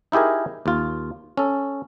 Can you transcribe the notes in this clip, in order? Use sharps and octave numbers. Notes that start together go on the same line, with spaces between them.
D#4 E4 G4 G#4 A#4
D#2 F4
C#4 A4